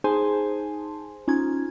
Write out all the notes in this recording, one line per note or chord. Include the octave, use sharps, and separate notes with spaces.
D#4 G#4 C5 G#5 A5 C6
C#4 D#4 F4 G#6